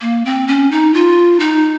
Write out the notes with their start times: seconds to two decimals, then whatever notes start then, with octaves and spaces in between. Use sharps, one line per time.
0.01 A#3
0.25 C4
0.48 C#4
0.71 D#4
0.94 F4
1.40 D#4